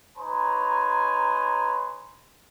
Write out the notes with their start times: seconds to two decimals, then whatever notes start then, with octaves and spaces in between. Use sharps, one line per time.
0.18 D#4 B4 C#5 G#5 A#5 C6